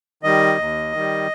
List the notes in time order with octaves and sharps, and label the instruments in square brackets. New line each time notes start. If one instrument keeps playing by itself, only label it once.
[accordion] D#3 G3 D#5
D#2
D#3 G3